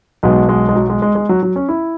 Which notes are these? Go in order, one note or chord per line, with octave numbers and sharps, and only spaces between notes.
B1 B2 G#3
G#3
G#3
F#3
G#3
G#3
G#3
F#3
F#3
C#4
E4